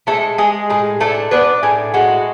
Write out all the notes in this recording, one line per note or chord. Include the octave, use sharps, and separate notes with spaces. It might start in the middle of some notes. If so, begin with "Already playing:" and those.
G#3 A3 A4
G#3 G#4
A2 G#4
A3 D4 A4
B3 D4 B4
A2 G#4
G#3 F#4